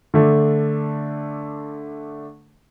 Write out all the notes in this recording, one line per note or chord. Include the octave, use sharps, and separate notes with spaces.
D3 A3 D4